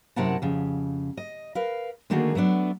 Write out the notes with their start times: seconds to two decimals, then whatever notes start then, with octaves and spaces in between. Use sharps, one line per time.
0.16 F#2 C3 E4 A#4 F#5 A5
0.42 F2 C#3
1.17 D#5
1.55 A#4 B4 F5
2.10 D3 D#3 A3 A#3 F#4 G#4
2.35 F#3 A3 B3 D4